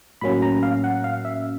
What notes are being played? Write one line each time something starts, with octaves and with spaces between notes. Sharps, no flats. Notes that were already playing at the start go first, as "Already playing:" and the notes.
A2 F#3 A#3 C#4 B5
A#5
F5
F#5
F5
E5